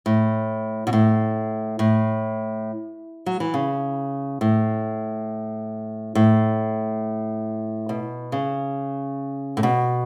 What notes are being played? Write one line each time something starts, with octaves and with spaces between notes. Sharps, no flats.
A2
B2
A2
A2
F#3
E3
C#3
A2
A2
B2
C#3
A2
B2